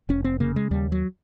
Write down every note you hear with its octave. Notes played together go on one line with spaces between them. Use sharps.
F1 C#4
C4
C#3 A#3
G#3
D#2 G3
F#3